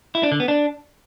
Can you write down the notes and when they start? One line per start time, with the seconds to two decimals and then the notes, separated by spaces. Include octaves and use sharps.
0.15 E4
0.23 D4
0.32 D3
0.40 B3
0.48 D4